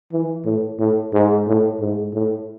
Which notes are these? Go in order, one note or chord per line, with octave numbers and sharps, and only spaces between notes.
E3
A2
A2
G#2
A2
G#2
A2